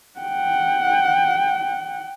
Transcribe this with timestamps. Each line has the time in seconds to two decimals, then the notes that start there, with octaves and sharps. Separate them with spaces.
0.19 F#5 G5